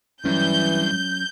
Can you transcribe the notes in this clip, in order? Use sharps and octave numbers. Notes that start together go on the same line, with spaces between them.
G2 E3 F#3 C#4 G6